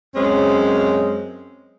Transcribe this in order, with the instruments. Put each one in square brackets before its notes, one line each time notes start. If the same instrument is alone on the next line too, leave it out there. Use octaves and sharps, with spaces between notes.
[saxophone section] F#2 G#3 C4 C#4